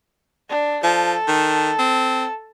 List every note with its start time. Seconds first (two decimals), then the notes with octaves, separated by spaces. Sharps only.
0.49 D4
0.83 F3 A4
1.28 D#3
1.79 C4